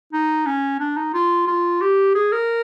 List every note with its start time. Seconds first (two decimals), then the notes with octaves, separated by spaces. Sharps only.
0.13 D#4
0.46 C#4
0.80 D4
0.97 D#4
1.14 F4
1.48 F4
1.81 G4
2.15 G#4
2.32 A#4